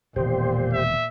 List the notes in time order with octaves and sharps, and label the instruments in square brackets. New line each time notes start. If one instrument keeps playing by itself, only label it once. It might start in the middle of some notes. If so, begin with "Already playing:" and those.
[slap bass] E1 D#3 [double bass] A#2 [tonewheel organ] G4 C5
[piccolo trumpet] E5